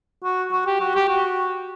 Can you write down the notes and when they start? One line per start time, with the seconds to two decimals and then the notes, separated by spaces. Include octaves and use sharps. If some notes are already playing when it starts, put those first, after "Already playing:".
0.24 F#4
0.52 F#4
0.66 G4
0.80 F#4
0.95 G4
1.09 F#4